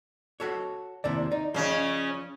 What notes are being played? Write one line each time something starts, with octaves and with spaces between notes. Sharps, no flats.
F#4 A4 C#5
D#2 C3 E4 D5
D#4 D5
C#3 F3 C#4 D#5